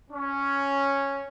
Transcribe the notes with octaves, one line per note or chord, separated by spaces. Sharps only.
C#4